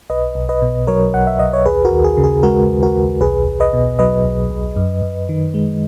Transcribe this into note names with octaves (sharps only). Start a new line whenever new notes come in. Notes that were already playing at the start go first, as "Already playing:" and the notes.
B1 B4 D#5
B1
B4 D#5
B2
F#3 A#4 C#5
B1 F#5
E5
B1 D#5
C#5
D#2 G#4 B4
F#4 A#4
D#2
G#4
C#3
G#4
G#3 F#4 A#4
D#2
F#4 A#4
D#2
B1 G#4 B4
B1
B4 D#5
B2
F#3 B4 D#5
B1
B1
F#2
F#2
D#3
G#3